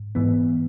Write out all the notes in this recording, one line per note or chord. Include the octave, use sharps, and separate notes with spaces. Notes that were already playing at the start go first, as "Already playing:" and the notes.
Already playing: G#2
G#2 E3 B3